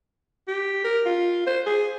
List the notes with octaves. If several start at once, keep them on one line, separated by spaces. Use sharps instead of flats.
G4
A#4
F4
C5
G#4